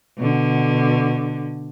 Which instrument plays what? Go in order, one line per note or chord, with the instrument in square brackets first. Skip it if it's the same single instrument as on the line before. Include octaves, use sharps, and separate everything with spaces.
[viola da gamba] B2 D3